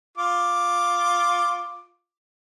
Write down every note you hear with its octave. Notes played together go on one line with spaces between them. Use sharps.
F4 D6